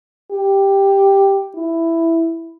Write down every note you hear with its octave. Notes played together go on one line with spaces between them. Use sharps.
G4
E4